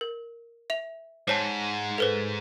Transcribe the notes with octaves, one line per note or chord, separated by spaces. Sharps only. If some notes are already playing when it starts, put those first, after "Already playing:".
A#4
E5 F7
G#2 C5 C#5 A5
A4 B4 C5